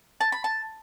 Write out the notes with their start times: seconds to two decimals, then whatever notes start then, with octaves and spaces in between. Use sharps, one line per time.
0.21 A5
0.32 B5
0.44 A5